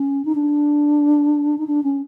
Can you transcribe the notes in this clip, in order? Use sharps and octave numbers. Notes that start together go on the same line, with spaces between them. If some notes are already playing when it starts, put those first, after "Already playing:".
Already playing: C#4
D#4
D4
D#4
D4
C#4